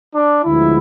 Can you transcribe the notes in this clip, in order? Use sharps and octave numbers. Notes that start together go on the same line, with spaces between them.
D4
D2 D3 F3 G#3 B3 E4